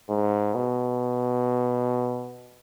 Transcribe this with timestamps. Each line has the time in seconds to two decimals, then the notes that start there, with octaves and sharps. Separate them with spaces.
0.09 G#2
0.54 B2